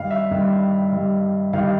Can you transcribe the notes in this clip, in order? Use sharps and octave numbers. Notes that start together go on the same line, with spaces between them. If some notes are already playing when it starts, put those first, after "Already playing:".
Already playing: G2 D#3 G3 F5
E5
G2 D#3 G3
G2 D#3 G3
G2 D#3 G3 F5